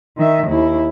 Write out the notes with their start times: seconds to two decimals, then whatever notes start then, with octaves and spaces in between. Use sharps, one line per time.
0.17 D#3 E5
0.48 D#2 E4